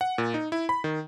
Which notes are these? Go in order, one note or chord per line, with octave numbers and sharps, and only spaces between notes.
F#5
A#2
D#4
E4
B5
D#3